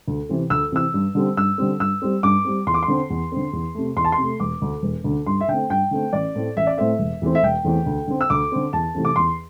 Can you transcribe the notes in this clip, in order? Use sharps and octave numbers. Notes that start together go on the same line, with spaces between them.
D2
C3 E3 C4
D2 E6
C3 E3 C4 E6
G2
D3 G3 C4
G2 E6
D3 G3 C4
G2 E6
G3 C4
G2 D6
G3 C4
E2 C6
D6
C6
D3 C4
E2
D3 C4
E2
C3 A3
E2 C6
A5
C6
C3 A3
E1 D6
D2 D3
E1
D2 D3
G2 C6
E5
D3 A3 C4 G5
G2 G5
D3 A3 C4
A1 D5
A2 A3 C4
A1 E5
D5
A2 A3 C4 E5
E1
E2 E3 A3 C4
E5
E1 G5
E2 E3 A3 C4
D2
D3 C4
E6
D2 D6
D3 C4
E2 A5
C3 E3 A3 C4
D6
E2 C6